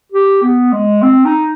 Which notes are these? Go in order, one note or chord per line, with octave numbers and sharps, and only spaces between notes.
G4
B3
G#3
C4
D#4